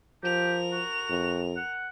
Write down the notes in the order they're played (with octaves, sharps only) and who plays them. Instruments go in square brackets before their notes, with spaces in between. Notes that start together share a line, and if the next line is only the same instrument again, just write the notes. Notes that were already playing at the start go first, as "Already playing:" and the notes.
[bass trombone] F3 [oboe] G4 [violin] A#4 F7
[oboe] F#4
[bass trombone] F2
[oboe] F#5